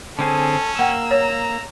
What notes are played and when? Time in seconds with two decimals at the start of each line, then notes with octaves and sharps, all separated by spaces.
0.19 D3 C4 C#4 G#4 A4
0.79 A#3 F#5 G5 E6
1.11 C#5 A#5